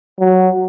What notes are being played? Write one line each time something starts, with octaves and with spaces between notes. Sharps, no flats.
F#3